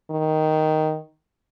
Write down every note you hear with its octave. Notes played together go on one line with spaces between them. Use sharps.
D#3